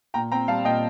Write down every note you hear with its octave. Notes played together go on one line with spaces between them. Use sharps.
A#2 G5 A#5
C4 G5 A#5
G3 F5 A5
A#2 D#5 G5